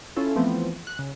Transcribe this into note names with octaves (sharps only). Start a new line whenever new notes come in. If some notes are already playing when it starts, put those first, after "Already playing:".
C#4 E4 F4 A4
E3 F3 A3 B3 C4
F#6
C#3